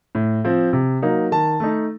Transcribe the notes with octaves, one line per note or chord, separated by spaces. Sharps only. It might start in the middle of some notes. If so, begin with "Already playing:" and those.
A2
F3 C4
C3
F#3 A#3 D#4
D#3 A5
A3 D#4